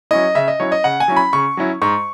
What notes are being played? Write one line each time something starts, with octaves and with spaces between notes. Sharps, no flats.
F#3 C#4 E4 D#5
C#3 E5
D#5
F#3 C#4 E4 C#5
D#5
C#3 F#5
G#5
F#3 C#4 E4
B5
C#3 C#6
F#3 C#4 E4
G#2 C#6